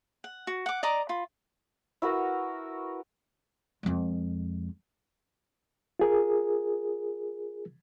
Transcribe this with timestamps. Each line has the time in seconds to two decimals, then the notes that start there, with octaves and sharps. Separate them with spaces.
0.24 F#5
0.47 F#4
0.66 F#5 D6
0.83 D5 D#5 A#5 D6
1.09 F4 B5
2.02 E4 F#4 A#4 B4
3.83 F2 G#3
5.99 F4 G#4 A#4